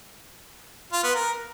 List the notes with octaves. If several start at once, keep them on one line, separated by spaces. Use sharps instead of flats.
F4
B3
A#4